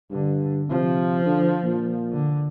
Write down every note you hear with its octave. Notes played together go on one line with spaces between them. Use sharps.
G2 D3
C3 F3
D3
A#2
D3